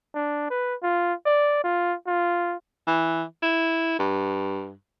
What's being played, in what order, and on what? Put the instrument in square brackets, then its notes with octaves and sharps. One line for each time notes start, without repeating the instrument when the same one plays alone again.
[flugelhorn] D4
B4
F4
D5
F4
F4
[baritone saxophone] E3
E4
G2